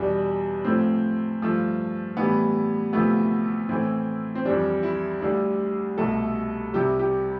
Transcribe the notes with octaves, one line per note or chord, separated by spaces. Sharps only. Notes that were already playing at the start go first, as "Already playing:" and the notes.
Already playing: E2 B2 G3 D4
A2 F3 A3 C4
G2 F3 A3
A2 E3 G3 B3
D2 C3 F3 A3 B3
A2 E3 A3 C4
C4
F2 E3 G3 D4
E4
D2 D3 G3 D4
C2 B2 A3 A4
C2 C3 G3 G4
G4